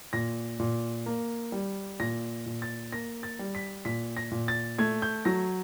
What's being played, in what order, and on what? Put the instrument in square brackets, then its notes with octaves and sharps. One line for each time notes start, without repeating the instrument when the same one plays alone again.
[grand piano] A#2 A#6
A#2
A#3
G3
A#2 A#6
A#2
A6
A#3 A#6
A6
G3
B6
A#2 B6
A#6
A#2
A6
A3 G#6
G6
F#3 A#6